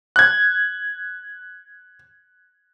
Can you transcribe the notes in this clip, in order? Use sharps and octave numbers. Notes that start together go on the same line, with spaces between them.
F#6 G#6